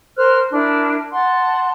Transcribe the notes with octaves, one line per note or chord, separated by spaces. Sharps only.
A#4 C5 F6 F#6
D4 E4 A#4
F#5 A5 C6